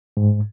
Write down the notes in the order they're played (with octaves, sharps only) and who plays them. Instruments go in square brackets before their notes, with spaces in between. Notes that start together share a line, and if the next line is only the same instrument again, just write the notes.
[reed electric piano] G#2